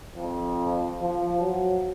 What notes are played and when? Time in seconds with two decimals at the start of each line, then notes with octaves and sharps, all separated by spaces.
0.17 F2
1.02 F3
1.40 F#3